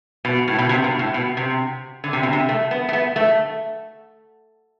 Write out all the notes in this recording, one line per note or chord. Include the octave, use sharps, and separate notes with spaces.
B2
A2
B2
C3
B2
A2
B2
C3
D3
C3
B2
C3
A3
B3
A3
B3
A3